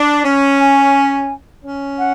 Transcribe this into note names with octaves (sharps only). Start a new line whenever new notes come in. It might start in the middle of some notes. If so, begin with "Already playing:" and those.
Already playing: D4
C#4
G#5
C#4
F#5